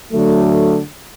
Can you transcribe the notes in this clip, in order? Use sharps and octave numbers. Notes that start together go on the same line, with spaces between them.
D3 F#3 A3